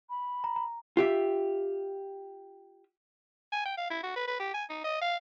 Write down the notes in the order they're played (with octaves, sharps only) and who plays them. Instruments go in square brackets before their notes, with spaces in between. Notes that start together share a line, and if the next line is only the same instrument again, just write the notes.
[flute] B5
[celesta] A#5
A#5
[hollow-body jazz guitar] F4 G4 E5
[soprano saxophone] G#5
G5
F5
E4
F#4
B4
B4
G4
G#5
D#4
D#5
F5